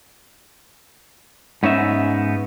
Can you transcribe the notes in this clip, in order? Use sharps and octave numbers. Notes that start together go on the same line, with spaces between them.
G#2 B3 C#4 D#4 E5